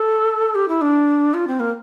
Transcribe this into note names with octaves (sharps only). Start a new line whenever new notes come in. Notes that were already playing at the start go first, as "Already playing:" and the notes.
Already playing: A4
G4
E4
D4
F4
C4
A#3